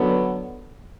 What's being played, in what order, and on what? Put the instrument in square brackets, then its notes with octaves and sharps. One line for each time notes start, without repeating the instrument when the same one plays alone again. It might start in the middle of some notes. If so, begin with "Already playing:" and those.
Already playing: [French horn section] D3 F#3 B3